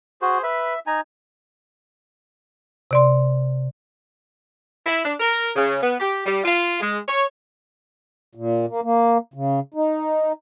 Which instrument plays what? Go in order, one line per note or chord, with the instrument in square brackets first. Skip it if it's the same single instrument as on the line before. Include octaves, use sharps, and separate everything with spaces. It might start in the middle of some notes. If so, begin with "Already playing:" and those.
[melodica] F#4 [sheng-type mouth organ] G#4 C5
[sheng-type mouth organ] B4 [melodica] E5
[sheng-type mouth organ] D#4 G#5 [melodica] A#5
[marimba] C3 D5 C6
[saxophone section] E4
D4
A#4
C#3
B3
G4
G3
F4
G#3
C#5
[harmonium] A#2
A#3
A#3
C#3
D#4